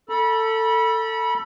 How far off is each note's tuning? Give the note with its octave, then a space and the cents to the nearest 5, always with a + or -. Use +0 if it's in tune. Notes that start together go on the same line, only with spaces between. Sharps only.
A4 +15 B5 -30